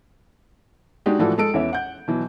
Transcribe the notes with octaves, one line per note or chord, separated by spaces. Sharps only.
G#3 D4 D#4 F#4 G4
A2 E3 F3 D4 F#4 A4
G#3 A4 D7
E2 E3 C#4 E5
F#5 G6
B2 E3 F#3